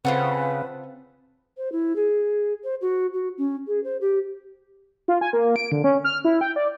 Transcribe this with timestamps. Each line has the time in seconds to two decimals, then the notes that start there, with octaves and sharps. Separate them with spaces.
0.05 C#3 C4 F4 A4 B4 F#5
1.57 C5
1.72 E4
1.96 G#4
2.64 C5
2.81 F#4
3.13 F#4
3.38 C#4
3.67 G#4
3.84 C5
4.01 G4
5.08 F4
5.21 G#5
5.33 A#3
5.56 D7
5.72 D3
5.84 C#4
6.04 F6
6.25 E4
6.41 G5
6.56 D5